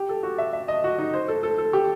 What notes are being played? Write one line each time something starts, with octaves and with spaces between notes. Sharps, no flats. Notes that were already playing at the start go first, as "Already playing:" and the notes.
Already playing: G4
A4
F#4
E5
E5
D#5
F#4
D#4
C5
A4
A4
A4
G4